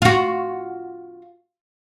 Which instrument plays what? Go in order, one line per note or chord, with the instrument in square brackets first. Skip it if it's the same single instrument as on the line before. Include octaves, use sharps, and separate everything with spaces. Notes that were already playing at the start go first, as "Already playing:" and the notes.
[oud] F4 F#4